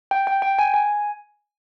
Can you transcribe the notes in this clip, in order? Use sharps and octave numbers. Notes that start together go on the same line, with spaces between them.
G5
G5
G5
G#5
G#5